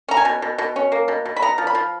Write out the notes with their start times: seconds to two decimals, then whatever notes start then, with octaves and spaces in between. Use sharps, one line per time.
0.08 C#4 A#5
0.17 G#5
0.25 B2
0.42 B2
0.58 B2
0.76 C#4
0.92 A#3
1.08 B2
1.26 B2
1.36 B5
1.42 B3 A#5
1.58 F3
1.67 B5
1.75 F3